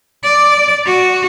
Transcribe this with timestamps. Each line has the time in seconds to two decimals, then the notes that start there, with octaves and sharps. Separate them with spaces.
0.23 D5
0.86 F#4